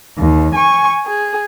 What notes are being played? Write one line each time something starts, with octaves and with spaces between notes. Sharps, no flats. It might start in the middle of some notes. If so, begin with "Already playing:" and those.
D#2
G#5 C#6
G#4